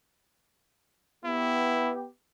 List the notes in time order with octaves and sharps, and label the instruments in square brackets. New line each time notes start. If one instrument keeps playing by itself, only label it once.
[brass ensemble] B3 G4 [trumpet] E4